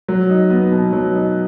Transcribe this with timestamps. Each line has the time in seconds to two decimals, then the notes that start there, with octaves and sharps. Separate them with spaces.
0.08 F#3
0.30 D#4
0.50 B3
0.72 B2
0.93 F#3
1.14 D#4